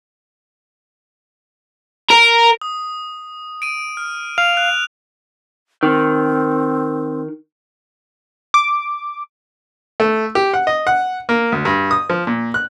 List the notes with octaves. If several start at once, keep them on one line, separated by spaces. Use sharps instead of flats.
A#4
D#6
D7 D#7
F6
F5 F7
F#6
D#3 C4
D6
A3
G4
F#5
D#5
F#5
A#3
D2
G2
D#6
F3
A#2
F#6